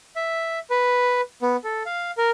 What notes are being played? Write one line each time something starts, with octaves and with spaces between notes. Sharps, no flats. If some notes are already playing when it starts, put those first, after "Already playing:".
E5
B4
B3
A4
F5
A#4